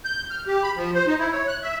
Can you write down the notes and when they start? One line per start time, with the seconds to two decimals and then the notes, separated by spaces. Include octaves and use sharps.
0.05 G6
0.31 F6
0.47 G4
0.63 B5
0.77 F3
0.95 C5
1.07 D#4
1.19 E4
1.32 C#5
1.48 F#6
1.63 E5